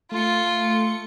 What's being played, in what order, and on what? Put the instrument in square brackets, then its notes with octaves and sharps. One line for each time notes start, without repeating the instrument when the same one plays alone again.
[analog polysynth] A3 C#7 [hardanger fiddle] F4